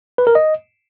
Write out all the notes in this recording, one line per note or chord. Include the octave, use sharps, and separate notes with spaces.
B4
A#4
D#5